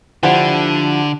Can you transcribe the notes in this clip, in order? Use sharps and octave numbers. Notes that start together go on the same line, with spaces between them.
D3 F3 D4 E4 G4 F#5